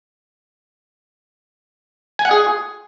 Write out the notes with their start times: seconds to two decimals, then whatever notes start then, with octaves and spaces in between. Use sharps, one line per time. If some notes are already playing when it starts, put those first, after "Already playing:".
2.19 G#5
2.25 F#5
2.31 G#4